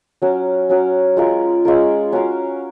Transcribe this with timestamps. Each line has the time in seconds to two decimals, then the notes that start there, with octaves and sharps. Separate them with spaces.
0.22 F#3 C#4 F#4 A#4
0.69 F#3 C#4 F#4 A#4
1.17 G#3 C#4 F4 A#4
1.65 G#3 C#4 F4 A#4
2.12 C#4 F#4 A#4 F5